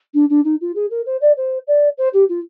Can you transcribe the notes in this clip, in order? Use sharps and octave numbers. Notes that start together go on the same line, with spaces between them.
D4
D4
D#4
F4
G#4
A#4
C5
D5
C5
D5
C5
G4
F4